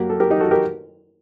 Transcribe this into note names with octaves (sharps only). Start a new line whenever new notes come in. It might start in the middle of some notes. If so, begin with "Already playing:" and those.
Already playing: F#2 F#3 A#3 G4 A#4
A4
G4 A#4
D#4 G4
F#4 A4
G4 A#4